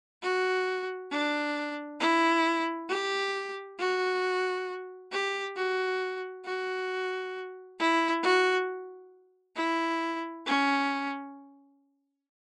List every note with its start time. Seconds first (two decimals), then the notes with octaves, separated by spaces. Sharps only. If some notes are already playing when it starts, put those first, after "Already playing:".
0.22 F#4
1.11 D4
2.00 E4
2.89 G4
3.78 F#4
5.12 G4
5.56 F#4
6.45 F#4
7.79 E4
8.23 F#4
9.56 E4
10.46 C#4